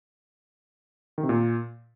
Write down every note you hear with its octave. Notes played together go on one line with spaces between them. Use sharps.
D#3
C3
A#2